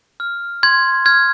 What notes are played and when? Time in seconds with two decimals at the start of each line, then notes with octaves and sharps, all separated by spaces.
0.20 F6
0.63 C6 G#6
1.06 F6 G#6